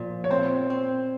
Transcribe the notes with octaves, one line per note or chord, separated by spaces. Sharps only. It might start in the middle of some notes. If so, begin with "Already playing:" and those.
Already playing: A#2 F3
C#5
C4 C5
C4